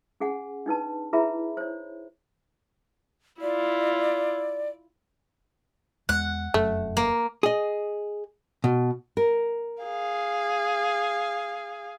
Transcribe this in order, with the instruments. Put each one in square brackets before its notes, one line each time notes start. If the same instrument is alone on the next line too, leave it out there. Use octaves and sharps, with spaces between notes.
[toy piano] C#4 G#4 F#5 G#5
D4 D#4 B4 A5
E4 G#4 B4 E5 A#5 B5
C5 C#5
[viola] E4 F4 [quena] D5
[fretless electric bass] E2 G#3 [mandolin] F#5
[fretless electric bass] F1 F#2 F#3 [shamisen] A3
[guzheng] A#3
[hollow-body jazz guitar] G#4 D#5
B2
[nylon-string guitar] A#4
[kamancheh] G#4 F5